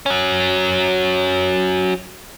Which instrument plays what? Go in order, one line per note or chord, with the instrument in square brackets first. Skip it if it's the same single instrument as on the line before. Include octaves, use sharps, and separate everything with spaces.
[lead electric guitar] F#3 C#4